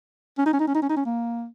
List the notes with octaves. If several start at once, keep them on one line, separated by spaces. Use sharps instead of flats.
C#4
D#4
C#4
D#4
C#4
D#4
C#4
D#4
C#4
A#3